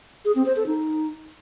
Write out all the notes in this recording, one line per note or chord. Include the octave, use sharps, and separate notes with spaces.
G#4
C4
C5
A4
D#4